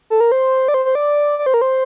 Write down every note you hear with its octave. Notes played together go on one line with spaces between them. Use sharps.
A4
A#4
C5
D5
C5
C5
D5
D5
C5
A#4
C5